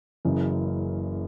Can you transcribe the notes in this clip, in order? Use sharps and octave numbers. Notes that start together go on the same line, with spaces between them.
F#1 F#2 C#3 E3